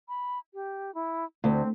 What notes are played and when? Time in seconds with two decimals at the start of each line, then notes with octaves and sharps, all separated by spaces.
0.09 B5
0.54 G4
0.94 E4
1.44 D2 C4